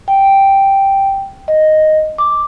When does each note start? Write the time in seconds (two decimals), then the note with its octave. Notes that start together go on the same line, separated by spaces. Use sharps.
0.08 G5
1.48 D#5
2.18 D6